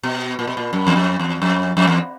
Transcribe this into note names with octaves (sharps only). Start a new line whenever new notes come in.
B2
A#2
B2
A#2
F#2
E2
F2
E2
F2
F2
E2